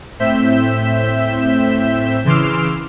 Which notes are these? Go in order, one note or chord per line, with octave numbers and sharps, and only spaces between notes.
A2 C4 E5 G6 B6 E7
C#3 E3 C6 D6 E6 F6